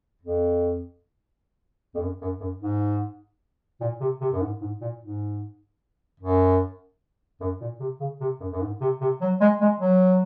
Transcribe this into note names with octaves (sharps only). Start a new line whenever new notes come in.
F2
F2
F#2
F#2
F#2
G#2
A#2
C3
C3
F#2
G#2
G#2
A#2
G#2
F#2
F#2
A#2
C3
C#3
C3
F#2
F#2
G#2
C3
C3
F#3
G#3
G#3
F#3